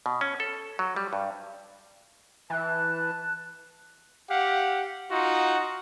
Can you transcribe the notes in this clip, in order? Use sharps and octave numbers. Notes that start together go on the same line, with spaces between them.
B2
C#4
A4
F#3
G3
G2
E3 A5 F#6
G4 F5 F#5
D#4 F4 F#4